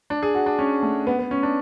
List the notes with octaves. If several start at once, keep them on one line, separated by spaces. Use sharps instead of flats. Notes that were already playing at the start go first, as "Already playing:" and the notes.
D4
G#4
F#4
D4
C#4
A3
B3
B3
C#4
D4